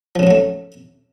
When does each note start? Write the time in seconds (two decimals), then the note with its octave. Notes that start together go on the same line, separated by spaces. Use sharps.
0.16 F3
0.19 C#3
0.23 G#2
0.27 F#3
0.31 A3